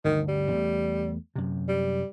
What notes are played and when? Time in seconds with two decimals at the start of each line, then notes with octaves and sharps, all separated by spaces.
0.04 G1 D2 D#3
0.28 G3
0.51 E2 A3
1.35 F#2 C3
1.68 G3